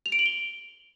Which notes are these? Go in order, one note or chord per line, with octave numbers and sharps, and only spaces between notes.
F7
D7
F#7
G7